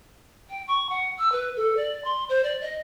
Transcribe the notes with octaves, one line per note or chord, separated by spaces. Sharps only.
G5
C#6
F#5
E6
B4
A4
D5
C6
C5
D5
D#5